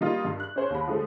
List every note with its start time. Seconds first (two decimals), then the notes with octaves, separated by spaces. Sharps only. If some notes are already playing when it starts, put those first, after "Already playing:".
0.01 G3 A#3 D#4 F4 A#4
0.25 G2
0.40 F#6
0.56 C#4 C5 C#5
0.70 D#2 B5
0.87 D3 F3 G#3 A3